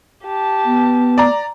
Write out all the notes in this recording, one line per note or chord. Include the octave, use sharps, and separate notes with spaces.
G4 A5
B3
D5 A#5